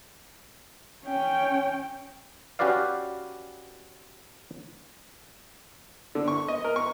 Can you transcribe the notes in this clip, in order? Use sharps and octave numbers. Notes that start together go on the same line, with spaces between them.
C#4 G5
C#4 F#4 G4 B4 D5 F5
D3
C#6
D#5
A#4
C#6